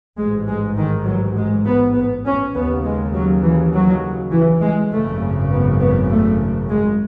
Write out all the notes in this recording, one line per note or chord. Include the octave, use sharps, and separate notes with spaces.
A1 G#2 G#3
G#3
D#3
F#3
G#3
B3
B3
C#4
D#2 C#3 B3
G#3
F#3
E3
F#3
E3
G#3
G#1 F#2 C#3 A3
B3
B3
A3
G#3